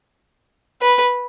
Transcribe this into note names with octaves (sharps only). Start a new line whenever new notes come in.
B4